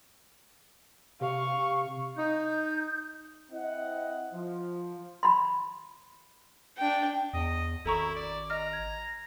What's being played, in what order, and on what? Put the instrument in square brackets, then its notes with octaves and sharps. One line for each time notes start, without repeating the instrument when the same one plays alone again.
[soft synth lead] C3 [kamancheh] F5 C#6
[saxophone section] D#4 [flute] G6
[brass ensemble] C4 E4 D#5 F#5
F3
[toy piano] B5 C6
[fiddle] D4 G5
[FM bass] E2 [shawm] D#5
[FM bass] G#1 [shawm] E4 [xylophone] A4 A#5 C#6
[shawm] D5
[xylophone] D#5 F6 [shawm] A#5
[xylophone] G#6